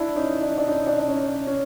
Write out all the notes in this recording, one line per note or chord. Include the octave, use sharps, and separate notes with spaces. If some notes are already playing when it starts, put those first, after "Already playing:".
Already playing: D4 E4
C#4 D#4
D4
D#4
D4
C#4 D#4
D4
D4
C#4
C#4